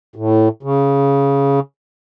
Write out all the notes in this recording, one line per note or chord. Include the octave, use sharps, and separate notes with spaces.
A2
C#3